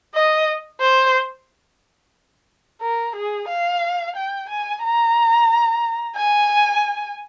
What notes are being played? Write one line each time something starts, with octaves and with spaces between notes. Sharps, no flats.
D#5
C5
A#4
G#4
F5
G5
G#5
A#5
G#5